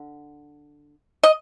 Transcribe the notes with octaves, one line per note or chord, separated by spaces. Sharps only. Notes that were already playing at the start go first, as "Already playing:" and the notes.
Already playing: D3
D#5